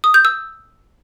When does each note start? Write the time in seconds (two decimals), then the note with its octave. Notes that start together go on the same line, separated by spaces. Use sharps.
0.04 D#6
0.14 G6
0.25 E6